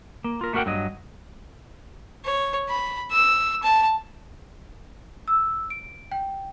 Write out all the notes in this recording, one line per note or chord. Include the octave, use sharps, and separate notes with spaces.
A#3
F4 A#4
A3 A#3 F#4 A#4 F#5 G5
G2 F#3 D#5
C#5
B5
E6
A5
E6
D7
G5